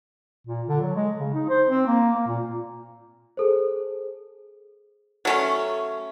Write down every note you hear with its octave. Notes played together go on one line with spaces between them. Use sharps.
A#2
D3
F#3
G#3
C#3
D#4
C5
C4
A#3
A#3
A#2
G#4 A4 C5
F#3 A3 C#4